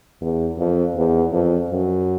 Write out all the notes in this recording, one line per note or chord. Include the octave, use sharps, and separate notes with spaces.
E2
F2
E2
F2
F#2